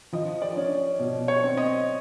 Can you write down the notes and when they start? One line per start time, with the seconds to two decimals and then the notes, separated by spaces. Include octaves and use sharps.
0.13 F3 D#5
0.42 D5
0.57 C#4
0.99 B2
1.28 C#5
1.44 C4
1.57 D#5